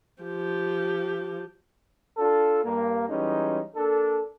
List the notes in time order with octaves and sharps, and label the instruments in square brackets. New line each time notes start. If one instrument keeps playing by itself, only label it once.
[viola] F3 G4
[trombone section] D4 F4 A4
G2 A#3
E3 G3 G#3 C#4 D#4
A#3 D4 A4